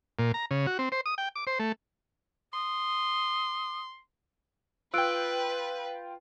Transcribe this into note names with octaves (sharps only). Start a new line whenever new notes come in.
A#2
A#5
C#3
F#4
C4
C5
D#6
G5
D6
C5
A3
C6 D#6
F4 B4 G5 E6 F#6 D7